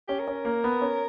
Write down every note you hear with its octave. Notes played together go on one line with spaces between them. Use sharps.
C#4 G4
A#4
C#4
A#3
B3
C#4